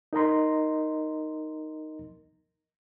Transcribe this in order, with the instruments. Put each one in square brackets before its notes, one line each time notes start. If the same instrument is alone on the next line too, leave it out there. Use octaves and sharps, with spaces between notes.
[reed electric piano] D#4 A#4 D#5 A#5 C6